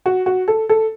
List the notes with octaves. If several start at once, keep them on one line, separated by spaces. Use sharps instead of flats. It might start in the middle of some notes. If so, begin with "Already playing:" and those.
F#4
F#4
A4
A4